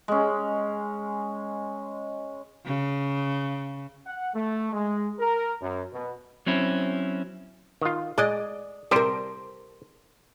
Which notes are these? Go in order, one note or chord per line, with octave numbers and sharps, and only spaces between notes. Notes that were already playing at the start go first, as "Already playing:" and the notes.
G#3 C#4
C#3
F#5
A3
G#3
A#4
F#2
B2
F#3 C4 C#4 E4
D#3 F4
G#3 D5 D#5
C3 G3 G4 A#4 C5